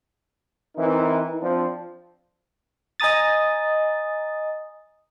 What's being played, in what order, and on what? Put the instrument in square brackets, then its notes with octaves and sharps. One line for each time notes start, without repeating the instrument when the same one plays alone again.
[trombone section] E3 C4 D#4 E4 A#4
F3 C4 D4
[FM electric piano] D#5 G#5 A#5 D#6 A6